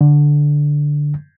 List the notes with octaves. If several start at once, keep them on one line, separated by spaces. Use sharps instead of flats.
D3